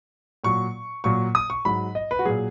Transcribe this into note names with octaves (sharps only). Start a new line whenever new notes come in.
A#2 F#3 C#6
A#2 F#3 C#6
D#6
C#6
G#2 F#3 B5
D#5
B4
F#4
A#2 F#3 G#4